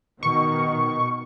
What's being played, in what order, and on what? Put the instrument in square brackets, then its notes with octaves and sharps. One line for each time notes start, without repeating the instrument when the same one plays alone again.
[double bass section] B2 D#3 [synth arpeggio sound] C#6